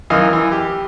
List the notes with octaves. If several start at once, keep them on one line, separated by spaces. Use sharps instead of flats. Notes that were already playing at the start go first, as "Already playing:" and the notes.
F#2 D#3 E3 D#5 F5
E3
G4